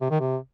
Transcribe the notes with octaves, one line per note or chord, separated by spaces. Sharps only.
C3
D#3
C3